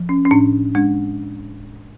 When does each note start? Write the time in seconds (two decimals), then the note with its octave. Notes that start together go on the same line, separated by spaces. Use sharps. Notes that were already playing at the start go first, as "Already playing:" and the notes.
Already playing: F3
0.09 C#4
0.25 C#4
0.31 A2 D4
0.75 G#3 D4